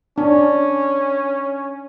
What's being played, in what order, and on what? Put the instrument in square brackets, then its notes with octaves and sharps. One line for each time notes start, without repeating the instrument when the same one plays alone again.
[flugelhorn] C#4 [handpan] D4